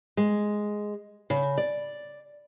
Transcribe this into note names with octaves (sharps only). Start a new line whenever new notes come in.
G#3
C#3
D5